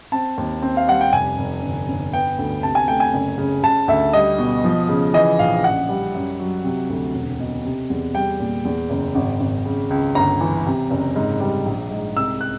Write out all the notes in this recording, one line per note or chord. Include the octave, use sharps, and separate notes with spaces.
C4 A5
D#2
C4
F5
G3 F#5
G5
F1 G#5
F1
G1
G1
B3 G5
D2
C3 A5
G#5
A3 G5
G#5
F#1
C#3
C#3 A5
D2 E5
G3 D#5
B2
F3
C#3
E3 D#5
A#1 F5
A1 F#5
G3
F#2
F#3
C3
D2
E1
B2
C3
E2
G3 G5
A#2
E2
F#1
G#1
G#1
C#3
C#2
G1 A#5
E3
C3
F#1
G#2
G3
A#1
G#2
C2 E6
F#6